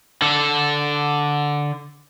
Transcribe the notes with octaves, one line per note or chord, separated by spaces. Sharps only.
D3 A4